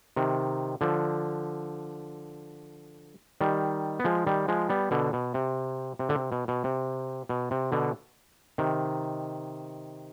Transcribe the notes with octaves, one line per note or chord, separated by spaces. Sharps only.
C3 D#3
D3 F3
D#3 G3
B3
F3 G#3
D#3 G3
F3 G#3
G3 B3
B2 D3
B2
C3
C3
D3
C3
B2
B2
C3
B2
C3
B2 D3
C3 D#3